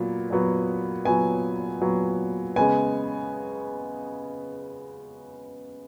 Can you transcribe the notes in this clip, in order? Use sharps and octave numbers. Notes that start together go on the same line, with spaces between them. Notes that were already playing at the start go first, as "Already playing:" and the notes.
Already playing: A#2 F#3 B3
A#2 F#3 B3
A#2 F#3 B3 G#5
A#2 F#3 B3
C#3 G#3 B3 G#5